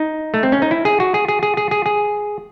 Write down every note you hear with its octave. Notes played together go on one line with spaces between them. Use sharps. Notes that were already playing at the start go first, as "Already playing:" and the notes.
Already playing: D#4
A3
C4
C#4
D#4
E4
G#4
F#4
G#4
G#4
G#4
G#4
G#4
G#4